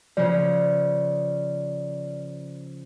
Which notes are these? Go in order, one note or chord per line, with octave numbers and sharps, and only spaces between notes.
C#3 F3 D5